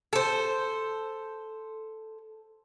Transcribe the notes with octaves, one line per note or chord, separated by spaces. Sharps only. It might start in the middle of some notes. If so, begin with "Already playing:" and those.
A4 C5